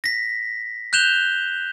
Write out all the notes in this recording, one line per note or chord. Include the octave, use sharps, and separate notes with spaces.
A#6 B6
F#6 G6 E7 F7 G7